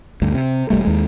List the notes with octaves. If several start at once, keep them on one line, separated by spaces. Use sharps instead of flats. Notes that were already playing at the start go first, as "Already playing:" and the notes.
D2 G2
C3
E1 C#2 G3 A3
D#2 G#3